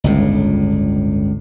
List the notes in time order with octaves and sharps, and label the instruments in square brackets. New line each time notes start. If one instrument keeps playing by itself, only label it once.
[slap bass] G1 C#2 A2